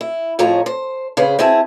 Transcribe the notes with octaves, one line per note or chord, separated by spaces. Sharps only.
E4
F2 A2 F3 G#4 C#5 A#5
C5
C#3 G#4 B4 C5
C4 E4 G#4 E5 A5